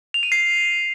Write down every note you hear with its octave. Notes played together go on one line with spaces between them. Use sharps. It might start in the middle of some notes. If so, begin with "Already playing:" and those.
F7
D#7
C7